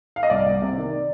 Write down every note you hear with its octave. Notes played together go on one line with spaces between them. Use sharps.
F5
D#5
C2 D5
C2
C3
D#3